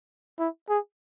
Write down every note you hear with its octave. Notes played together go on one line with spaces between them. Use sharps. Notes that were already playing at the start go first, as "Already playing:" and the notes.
E4
G#4